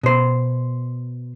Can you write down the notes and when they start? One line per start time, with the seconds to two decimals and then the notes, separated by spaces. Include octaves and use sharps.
0.03 B2 C5